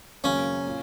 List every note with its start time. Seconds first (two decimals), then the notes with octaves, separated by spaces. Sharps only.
0.24 G#1 F#2 C#3 A#3 C#4
0.67 A#2